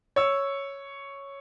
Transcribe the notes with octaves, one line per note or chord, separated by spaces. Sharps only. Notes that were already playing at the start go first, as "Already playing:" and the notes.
C#5 E6